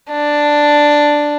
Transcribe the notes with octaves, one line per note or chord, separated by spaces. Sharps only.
D4